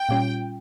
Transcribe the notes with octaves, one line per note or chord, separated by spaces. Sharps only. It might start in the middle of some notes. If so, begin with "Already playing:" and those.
Already playing: G5
A#2 G3 C#4 F4